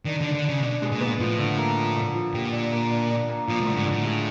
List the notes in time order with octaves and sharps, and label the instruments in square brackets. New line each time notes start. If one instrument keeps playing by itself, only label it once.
[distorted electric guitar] D#3 [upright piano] D4
[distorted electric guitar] D3
[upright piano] D4
[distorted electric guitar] D3
[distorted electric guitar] C#3 [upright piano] D4
[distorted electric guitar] B2 [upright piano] D4
[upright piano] G#3
[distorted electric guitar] A#2
[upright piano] B3
[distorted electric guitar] A2 [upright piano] F3
[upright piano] D3
A#3
F3
D3
F3
[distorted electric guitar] A#2 [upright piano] G4
[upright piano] D4
A#3
D4
D4
A#3
[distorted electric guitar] A#2 [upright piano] F3
[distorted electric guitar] A2 [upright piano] D3
[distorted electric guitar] G#2
[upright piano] D3
[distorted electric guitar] A2
[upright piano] G#3